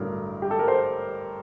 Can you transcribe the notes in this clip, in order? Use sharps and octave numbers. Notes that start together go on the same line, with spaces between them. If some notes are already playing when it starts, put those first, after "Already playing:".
Already playing: A1 G2 D3 F#3 A#4
G4
A4
A#4
C5